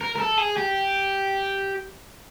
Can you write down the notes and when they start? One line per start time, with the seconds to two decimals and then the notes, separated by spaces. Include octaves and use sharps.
0.01 A#4
0.16 A#4
0.20 A4
0.38 G#4
0.57 G4